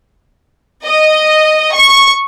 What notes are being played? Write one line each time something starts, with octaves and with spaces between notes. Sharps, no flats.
D#5
C#6